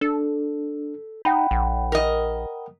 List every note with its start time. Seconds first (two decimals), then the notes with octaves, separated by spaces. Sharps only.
0.01 D4 A4
1.25 D#4 F#5 G5 B5
1.51 A#1
1.92 A#4 D#5